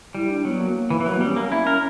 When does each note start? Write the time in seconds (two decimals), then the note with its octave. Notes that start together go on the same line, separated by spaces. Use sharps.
0.15 G3 E4
0.30 D4
0.45 F#3 B3
0.60 A#3
0.90 E3
1.00 E3
1.06 F#3 A#3
1.16 B3
1.21 G3
1.27 C#4
1.36 A#3
1.52 E4
1.67 A#4